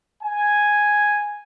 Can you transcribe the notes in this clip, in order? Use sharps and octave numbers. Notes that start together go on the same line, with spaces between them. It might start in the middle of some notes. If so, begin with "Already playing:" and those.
G#5